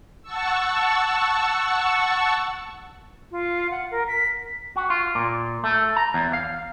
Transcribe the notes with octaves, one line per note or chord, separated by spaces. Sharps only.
F#5 A5 C#6 E6
F4
F#5
A#4
B6
F#4
F4
A#2
A3
A#5
E2
F5